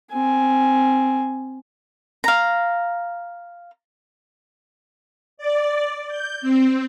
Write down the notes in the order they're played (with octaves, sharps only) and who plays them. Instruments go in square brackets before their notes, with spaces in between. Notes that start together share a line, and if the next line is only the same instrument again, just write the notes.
[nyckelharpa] C4 G#5
[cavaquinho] F5 A#5
[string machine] D5
G6
C4